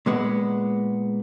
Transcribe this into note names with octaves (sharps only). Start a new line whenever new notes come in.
A#2 G#3 B3